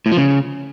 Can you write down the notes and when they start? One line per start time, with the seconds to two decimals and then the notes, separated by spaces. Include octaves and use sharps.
0.06 A2
0.12 F3
0.18 C#3